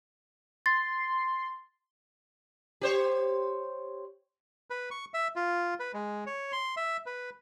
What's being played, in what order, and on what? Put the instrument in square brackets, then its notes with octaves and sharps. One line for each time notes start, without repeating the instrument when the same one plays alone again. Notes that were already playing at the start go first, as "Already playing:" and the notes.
[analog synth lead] C6 [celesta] A6
[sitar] G4 C5 C#5
[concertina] B4
C#6
E5
F4
B4
G#3
C#5
C6
E5
B4